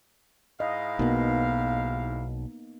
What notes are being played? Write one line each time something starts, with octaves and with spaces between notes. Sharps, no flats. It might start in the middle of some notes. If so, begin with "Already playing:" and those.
G#2 E4 D#5 F5
B1 B2 A#3 B3 D#4